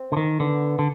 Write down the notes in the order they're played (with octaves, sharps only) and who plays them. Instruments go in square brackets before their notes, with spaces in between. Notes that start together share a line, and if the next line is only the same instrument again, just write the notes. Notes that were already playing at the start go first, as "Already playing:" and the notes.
Already playing: [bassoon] C4
[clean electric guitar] D3
D#3
[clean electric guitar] D3 [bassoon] B3
[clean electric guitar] D3